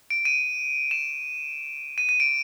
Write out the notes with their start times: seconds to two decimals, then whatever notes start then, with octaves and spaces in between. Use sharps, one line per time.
0.10 D7
0.25 D#7
0.91 E7
1.98 D#7
2.09 D#7
2.20 D7